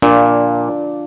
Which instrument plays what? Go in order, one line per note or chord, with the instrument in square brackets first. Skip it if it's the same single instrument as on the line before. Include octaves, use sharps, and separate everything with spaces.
[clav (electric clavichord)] A#2 [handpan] D4 F4 D5